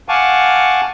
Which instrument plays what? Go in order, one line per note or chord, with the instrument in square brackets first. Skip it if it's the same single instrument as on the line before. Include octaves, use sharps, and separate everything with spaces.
[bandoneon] F5 F#5 G#5 A5 C#6 D6